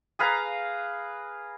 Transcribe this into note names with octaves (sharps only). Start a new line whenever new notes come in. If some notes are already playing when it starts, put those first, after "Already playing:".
G#4 B4 F5 A#5